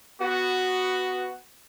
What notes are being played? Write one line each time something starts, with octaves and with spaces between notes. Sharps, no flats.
B3 F#4